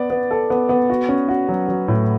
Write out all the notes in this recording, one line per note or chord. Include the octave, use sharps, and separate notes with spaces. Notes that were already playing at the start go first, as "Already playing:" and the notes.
Already playing: B3 D5
B3
A4
B3
B3
F#4
C#4
F#4
F#3
F#3
A2